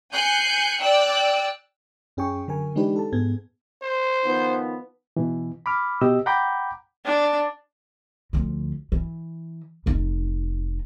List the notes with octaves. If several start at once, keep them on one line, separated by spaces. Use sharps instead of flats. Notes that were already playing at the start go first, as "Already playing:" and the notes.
G#5 F#6 G6 C7 C#7
D5 G5 E6 F#6
F#2 C#4 G#4 G5 G#5 C#6
D3 F#3 A#4 G#5
E3 G#3 D4 D#4 G4 B4
A4 A5
G#2 B3 G#4 G#6
C5
D#3 F3 B3
B2 E3
B5 D6 F6
B2 G4 D#5 E6
F#5 G5 A#5 B5 D6 G6
D4
D2 F3
E3
F1 D#4